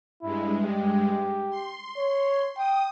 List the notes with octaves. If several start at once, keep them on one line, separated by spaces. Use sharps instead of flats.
G2 G#3 E4
G4
C6
C#5
G5 D#6